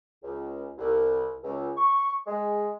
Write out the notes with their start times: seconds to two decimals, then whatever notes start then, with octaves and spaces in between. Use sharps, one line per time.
0.23 C#2
0.78 C2
1.44 C#2
1.77 C#6
2.27 G#3